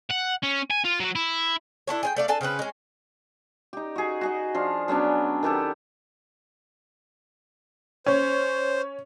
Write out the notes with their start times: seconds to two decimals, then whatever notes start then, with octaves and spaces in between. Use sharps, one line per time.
0.11 F#5
0.43 C#4
0.71 G#5
0.85 F4
1.00 F#3 F#4
1.15 E4
1.87 D4 E4 A4 C#5
2.03 G#4 C#5 G5
2.16 A3 D5 F5
2.28 D4 A4 G#5 A5
2.41 C#3 C4 C#4 B4
2.59 G#3 C#4
3.73 D#4 G4
3.96 F#4 G#4
4.21 F#4 G#4 D#5
4.55 F3 D4 F5
4.88 F#3 B3 C#4 D4
5.43 D#3 B3 G4 A4
8.06 C#4 C5